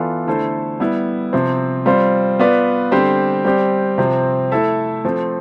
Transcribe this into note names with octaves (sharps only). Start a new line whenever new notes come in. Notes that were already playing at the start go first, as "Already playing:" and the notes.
Already playing: E3 B3 F4 A4 D5
D3 A3 E4 A4 C5
G3 B3 E4
C3 F3 C4
G3 C4 F4 C5
B3 F4 B4 D5
D3 G3 C4 G4 C5
G3 C4 G4
C3 F3 C4
A3 E4 A4 E5
F3 A3 C4